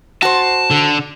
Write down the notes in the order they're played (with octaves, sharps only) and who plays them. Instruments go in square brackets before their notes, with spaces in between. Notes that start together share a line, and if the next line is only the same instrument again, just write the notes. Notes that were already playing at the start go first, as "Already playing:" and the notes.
[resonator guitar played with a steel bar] F#4 C5 [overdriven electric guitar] A5
[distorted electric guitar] D3